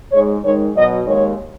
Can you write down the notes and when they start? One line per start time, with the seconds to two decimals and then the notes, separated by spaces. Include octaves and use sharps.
0.10 G#2 G#3 C#5
0.42 G#2 D#3 G#3 C#5
0.74 B2 F#3 D#5
1.06 D#2 D#3 G#3 C#5